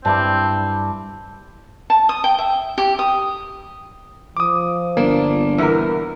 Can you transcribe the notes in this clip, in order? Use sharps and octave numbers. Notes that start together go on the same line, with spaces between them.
G2 C4 D4 E4 A5
A5
D#6
G5
E5
G4
D#6
F3 D6 D#6
G1 A#3 D4
E2 B2 E3 A#4